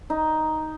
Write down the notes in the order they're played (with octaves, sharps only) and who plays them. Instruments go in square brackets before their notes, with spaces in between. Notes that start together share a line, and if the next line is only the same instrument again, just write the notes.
[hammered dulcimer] D#4